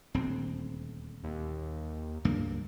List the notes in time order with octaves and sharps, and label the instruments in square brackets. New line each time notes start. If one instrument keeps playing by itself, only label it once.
[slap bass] D#1 D2 C4
[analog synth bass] D#2
[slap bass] C#2 G2 A#3